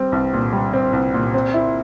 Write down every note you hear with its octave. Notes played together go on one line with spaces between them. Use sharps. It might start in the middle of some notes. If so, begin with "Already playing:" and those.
Already playing: G3 C4
C2
A#2
G3
C4
C2
A#2
C4
E4